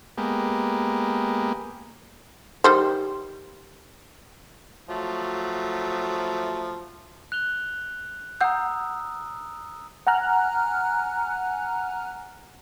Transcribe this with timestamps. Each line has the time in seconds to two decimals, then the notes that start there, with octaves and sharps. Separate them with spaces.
0.18 G#3 A#3 B3 G4
2.64 D#3 G3 C5
4.89 F3 F#3 A3
7.32 F#6 F7 G7
8.41 F#5 A#5 D#6 E6 G6
10.07 F#5 G#5 A#5 F6 F#6